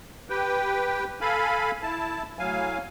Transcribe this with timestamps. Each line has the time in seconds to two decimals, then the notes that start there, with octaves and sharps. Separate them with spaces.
0.29 G4 B4 G5
1.21 A4 F5 G#5 B5
1.82 E4 A5
2.39 A2 F#3 F5 G#5